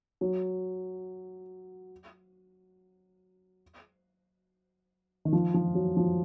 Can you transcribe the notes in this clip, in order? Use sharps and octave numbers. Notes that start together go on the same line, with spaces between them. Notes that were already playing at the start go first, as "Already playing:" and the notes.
F#3
D#3
F3
F3
F#3
F3